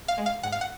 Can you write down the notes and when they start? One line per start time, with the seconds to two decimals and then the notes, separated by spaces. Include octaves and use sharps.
0.08 F5
0.18 G#3
0.26 F5
0.43 G#2 F#5
0.52 F5
0.61 F#5